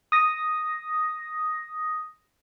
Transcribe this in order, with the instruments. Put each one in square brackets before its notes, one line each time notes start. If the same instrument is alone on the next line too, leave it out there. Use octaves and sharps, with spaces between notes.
[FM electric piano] D#6 A#6